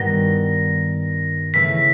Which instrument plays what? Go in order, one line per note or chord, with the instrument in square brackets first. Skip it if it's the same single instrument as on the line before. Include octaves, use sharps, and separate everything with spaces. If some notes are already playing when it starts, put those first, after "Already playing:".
Already playing: [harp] G2 D#3 G3 B3 D#4 [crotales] A#6
[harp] C#3 E3 A3 [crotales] B6